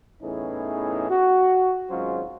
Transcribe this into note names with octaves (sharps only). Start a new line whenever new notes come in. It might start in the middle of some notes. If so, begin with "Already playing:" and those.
E2 A2 E3 C#4 D#4 G#4
F#4
G#1 F#3 G#3 C#4 F4 C5